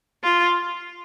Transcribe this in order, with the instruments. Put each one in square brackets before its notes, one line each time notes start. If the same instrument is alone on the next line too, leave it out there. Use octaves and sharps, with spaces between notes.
[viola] F4